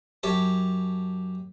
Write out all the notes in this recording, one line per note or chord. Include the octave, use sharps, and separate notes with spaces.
F#2 G4 C#5 A5